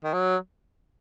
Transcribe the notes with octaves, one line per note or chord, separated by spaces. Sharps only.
D#3
F#3